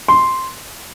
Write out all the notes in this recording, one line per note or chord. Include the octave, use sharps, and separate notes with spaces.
C6